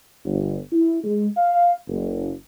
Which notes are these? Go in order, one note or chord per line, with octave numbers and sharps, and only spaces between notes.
G1
E4
G#3
F5
F#1